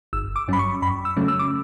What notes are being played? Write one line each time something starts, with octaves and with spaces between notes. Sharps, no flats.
G1 E6
D6
G2 F#3 C#4 B5
C#6
F#2 B5
E6
C#3 F#3 A3 C#4
E6
D6